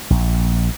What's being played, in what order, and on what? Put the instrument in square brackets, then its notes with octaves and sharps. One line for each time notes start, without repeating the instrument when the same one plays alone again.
[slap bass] A#1